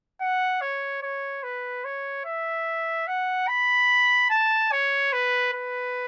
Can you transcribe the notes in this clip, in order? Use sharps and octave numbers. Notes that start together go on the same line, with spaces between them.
F#5
C#5
C#5
B4
C#5
E5
F#5
B5
A5
C#5
B4
B4